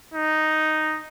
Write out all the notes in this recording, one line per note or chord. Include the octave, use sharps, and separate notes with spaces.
D#4